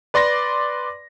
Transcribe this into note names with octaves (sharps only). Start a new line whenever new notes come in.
B4 D5 C6 D6 A#6